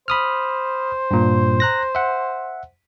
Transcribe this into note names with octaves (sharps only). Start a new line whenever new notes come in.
C5 B5 D#6 F6
G2 A#2
A#5 F#6 A#6
E5 F#5